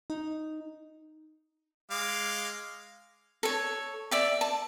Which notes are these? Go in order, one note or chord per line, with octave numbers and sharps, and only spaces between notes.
D#4
G#3 F5 D6
A4 C#5
D5 E5 D6
A5